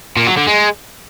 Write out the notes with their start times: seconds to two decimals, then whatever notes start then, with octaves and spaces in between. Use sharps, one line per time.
0.17 A#2
0.27 F#3
0.37 D3
0.47 G#3